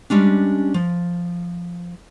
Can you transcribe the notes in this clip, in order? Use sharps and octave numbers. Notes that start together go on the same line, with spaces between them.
G3 G#3 C#4 D4
F3